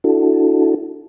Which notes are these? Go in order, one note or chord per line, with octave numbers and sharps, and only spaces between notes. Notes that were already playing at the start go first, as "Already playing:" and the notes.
D4 E4 F#4 A4